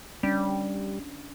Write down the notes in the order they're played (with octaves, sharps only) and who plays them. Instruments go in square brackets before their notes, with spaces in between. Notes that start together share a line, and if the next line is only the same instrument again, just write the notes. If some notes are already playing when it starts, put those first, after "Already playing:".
[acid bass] G3 [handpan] C#4 D4